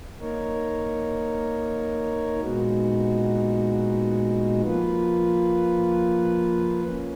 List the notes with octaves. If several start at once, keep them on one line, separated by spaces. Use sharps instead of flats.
A#3 D#4 A#4 C#5
A#2 G#3 B3 D#4 F#4
F3 A#3 F4 B4
A#3 C#4